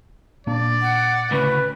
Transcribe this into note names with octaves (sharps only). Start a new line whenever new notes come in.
A#2 A#3 D4 D5
F#5
D2 A2 C#3 B4